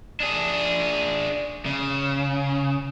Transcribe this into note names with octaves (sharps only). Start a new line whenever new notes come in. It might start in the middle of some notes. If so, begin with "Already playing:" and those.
D4 G#4
C#3